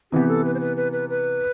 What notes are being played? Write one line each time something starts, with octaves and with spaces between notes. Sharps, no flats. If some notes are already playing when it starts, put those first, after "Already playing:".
C3 E3 B3 G4
A4
B4
C5
B4
B4
B4
B4